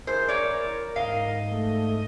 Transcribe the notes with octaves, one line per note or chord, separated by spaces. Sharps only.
E4 G#4 A#4 C5
A#4 C#5 D5
G#2 D#5 F5
A3